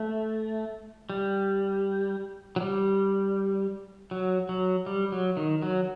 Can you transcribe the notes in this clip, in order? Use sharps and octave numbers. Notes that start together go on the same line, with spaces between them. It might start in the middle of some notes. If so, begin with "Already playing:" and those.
Already playing: A3
G3
F#3
G3
F#3
F#3
G3
F#3
D#3
F#3